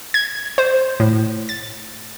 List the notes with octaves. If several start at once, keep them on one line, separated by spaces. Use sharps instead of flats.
G#6
C5
A2
A6